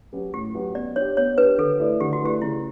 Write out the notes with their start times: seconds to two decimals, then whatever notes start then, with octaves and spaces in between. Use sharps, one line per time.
0.13 F#3 C#4 G4 B4
0.33 A2 G4
0.54 F#3 C#4 G4 B4
0.75 B3 D5
0.96 D4 G4 C#5
1.17 B3 C#5
1.38 D4 G4 B4
1.58 D3 A4
1.79 A3 E4 B4 D5
2.00 D3 G4
2.13 F#4
2.21 A3 E4 G4 B4 D5
2.42 C#3 E4